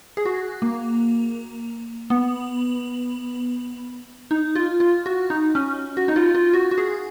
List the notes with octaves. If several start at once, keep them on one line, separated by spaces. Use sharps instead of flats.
G#4
F#4
A#3
B3
D#4
F4
F4
F#4
D#4
C#4
F#4
D#4
F4
F4
F#4
F#4
G#4